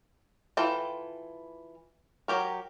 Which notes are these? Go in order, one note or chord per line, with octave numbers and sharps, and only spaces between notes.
E3 F4 A4 G5
F#3 G4 A#4